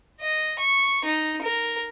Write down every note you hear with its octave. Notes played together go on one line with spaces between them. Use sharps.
D#5
C#6
D#4
A#4